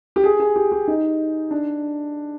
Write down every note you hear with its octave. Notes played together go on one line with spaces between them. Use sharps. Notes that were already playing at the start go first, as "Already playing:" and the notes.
G4
G#4
G#4
G4
G4
D#4
D4